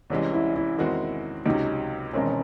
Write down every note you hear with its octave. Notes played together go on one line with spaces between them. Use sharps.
C2 C3 E3 G#3 C#4
E4
E4
E2 D#3 G#3 C4 E4 F#4
C#2 C3 F#3 C#4 D#4
E1 E2 D#3 G#3 C4 C#4